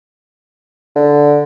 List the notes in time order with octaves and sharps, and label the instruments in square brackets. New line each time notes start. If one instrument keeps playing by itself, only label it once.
[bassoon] D3